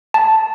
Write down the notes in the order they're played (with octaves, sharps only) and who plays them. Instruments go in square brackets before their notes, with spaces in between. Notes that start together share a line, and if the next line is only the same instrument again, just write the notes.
[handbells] A5